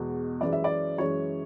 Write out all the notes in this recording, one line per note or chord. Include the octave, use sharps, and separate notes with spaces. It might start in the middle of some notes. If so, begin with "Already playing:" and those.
Already playing: E2 B2 G#3
F#2 E3 G#3 D5
E5
D5
F#2 E3 G#3 C#5